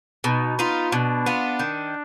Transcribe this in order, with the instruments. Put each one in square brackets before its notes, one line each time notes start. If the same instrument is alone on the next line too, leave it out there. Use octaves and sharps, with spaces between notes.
[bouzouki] B2 [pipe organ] D#4
[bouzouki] B3 F4 [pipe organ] D#4
[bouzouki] B2 [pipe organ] D4
[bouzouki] B3 F4
D#3